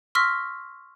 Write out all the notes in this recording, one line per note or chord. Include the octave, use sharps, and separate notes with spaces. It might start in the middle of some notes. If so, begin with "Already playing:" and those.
C6 C#6 E6 F6 A#6 B6